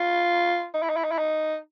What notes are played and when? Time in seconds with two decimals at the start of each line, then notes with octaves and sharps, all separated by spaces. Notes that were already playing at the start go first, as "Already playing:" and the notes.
Already playing: F4
0.74 D#4
0.83 E4
0.89 D#4
0.96 E4
1.04 D#4
1.11 E4
1.18 D#4